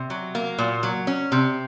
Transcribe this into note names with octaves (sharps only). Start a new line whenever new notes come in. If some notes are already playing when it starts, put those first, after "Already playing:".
Already playing: C3
F#3
A#3
A#2
F#3
C#4
C3